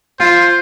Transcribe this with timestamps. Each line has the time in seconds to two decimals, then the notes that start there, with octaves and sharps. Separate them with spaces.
0.20 F4 C5